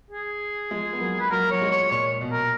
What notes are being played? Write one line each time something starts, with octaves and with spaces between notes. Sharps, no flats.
G#4
F3 G#3
B3
F#3 A#3
B4
F#3 A#3 A#4
F#3 C#5
F3 G#3
C#5
A#2 C#5
B2
A#4